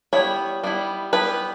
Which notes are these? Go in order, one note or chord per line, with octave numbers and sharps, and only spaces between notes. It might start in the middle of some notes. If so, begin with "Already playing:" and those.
G3 B3 E4 C#5
G3 B3 E4
G3 B3 E4 B4